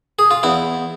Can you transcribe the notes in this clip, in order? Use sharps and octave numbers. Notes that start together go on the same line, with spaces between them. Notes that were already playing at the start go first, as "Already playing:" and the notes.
G#4
F4
E2 E4